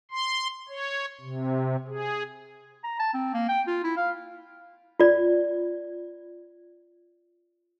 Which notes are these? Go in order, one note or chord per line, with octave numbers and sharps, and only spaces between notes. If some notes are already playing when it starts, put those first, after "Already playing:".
C6
C#5
C3
G#4
A#5
A5
C4
A#3
G5
F4
E4
F5
F4 D5